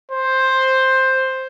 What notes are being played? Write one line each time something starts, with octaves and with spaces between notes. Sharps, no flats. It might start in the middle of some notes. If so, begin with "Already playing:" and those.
C5